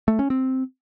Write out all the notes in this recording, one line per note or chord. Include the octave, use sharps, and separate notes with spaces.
A3
C#4
C4